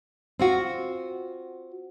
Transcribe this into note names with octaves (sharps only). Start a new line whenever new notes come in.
C4 F4 F#4